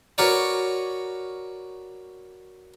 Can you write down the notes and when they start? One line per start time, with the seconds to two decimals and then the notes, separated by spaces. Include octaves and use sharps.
0.18 F#4 A#4 B4 C#5 D5